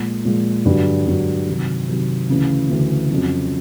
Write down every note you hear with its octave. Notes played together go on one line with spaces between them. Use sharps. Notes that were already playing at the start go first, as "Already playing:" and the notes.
Already playing: A#2 F3 G#3
A#2 F3 G#3
G2 D3 F#3
G2 D3 F#3
C3 D#3 F#3
C3 D#3 F#3
D2 C#3 E3
D2 C#3 E3
F2 C#3 F#3